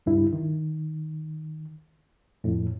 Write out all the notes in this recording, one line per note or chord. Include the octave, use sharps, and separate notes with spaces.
C#2 G2 E4
D#3
F2 A2